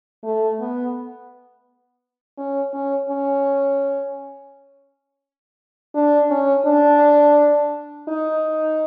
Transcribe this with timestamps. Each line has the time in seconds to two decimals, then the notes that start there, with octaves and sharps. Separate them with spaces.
0.24 A3
0.60 B3
2.38 C#4
2.73 C#4
3.09 C#4
5.94 D4
6.30 C#4
6.66 D4
8.09 D#4